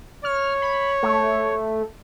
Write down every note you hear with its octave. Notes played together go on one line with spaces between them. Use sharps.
C#5 F6
B5
A3